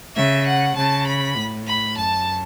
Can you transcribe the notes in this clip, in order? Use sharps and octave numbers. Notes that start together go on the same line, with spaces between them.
C#3 E5
F#5
C#3 A5
B5
A2
B5
F#2 A5